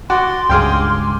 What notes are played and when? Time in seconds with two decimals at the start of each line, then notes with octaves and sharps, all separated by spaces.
0.10 F#4 C6 D6 A6
0.50 C#2 G2 G#4 F5 G5 D6